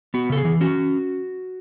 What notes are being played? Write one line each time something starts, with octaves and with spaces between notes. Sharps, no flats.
B3 F#4
C#3 A4
G#4
E3
C#4 F#4